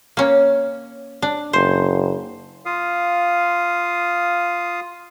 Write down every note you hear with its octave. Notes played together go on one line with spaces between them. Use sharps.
A#3 C#4
D4
F#1 C5
F4 F5 D#6